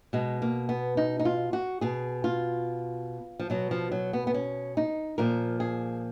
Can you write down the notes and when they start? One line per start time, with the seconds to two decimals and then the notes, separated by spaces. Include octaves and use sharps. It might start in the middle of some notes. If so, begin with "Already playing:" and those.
0.13 B2 G#3
0.42 A#3
0.69 B3
0.97 D#4
1.19 D#4
1.25 F4
1.53 F#4
1.81 B2 G#4
2.24 F4
3.39 F3
3.50 B2 F#3
3.71 F3
3.92 F#3
4.13 B3
4.27 B3
4.34 C#4
4.77 D#4
5.18 A#2 F3 A#4
5.60 G#4